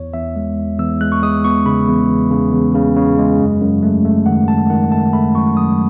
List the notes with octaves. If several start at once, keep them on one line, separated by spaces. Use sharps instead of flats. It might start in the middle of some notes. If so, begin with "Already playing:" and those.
Already playing: E2 C#5
E2 E5
G#3
E2
E2 E6
G#3 F#6
C#6
G#3 D#6
B3 C#6
C#3 B5
E2
E2
C#3
E2
C#3
C#3
G#3
F#2
F#2
A3
A3
D#3 F#5
F#2 A5
D#3 F#5
A3 A5
A3 B5
F#2 C#6
F#3 D#6